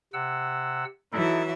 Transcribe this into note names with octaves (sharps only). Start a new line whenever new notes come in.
C3 F#5 E6
E3 F#3 D#4 E4 A4 E5